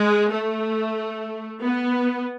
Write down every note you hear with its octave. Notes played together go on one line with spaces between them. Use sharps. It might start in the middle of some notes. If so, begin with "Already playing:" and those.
Already playing: G#3
A3
B3